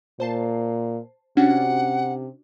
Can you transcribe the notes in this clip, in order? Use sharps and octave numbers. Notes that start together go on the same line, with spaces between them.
A#2 C5 A5 C7
C3 C#4 D4 F#4 F#5